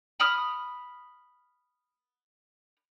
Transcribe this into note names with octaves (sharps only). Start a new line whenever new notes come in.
B5 D#6 F6